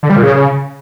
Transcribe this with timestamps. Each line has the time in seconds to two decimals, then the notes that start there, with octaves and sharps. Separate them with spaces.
0.03 D3
0.10 G3
0.16 A#2
0.23 C#3